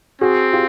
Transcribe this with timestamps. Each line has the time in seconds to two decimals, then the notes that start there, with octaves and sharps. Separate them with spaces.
0.21 C4 F#4 G#4
0.53 F4 G4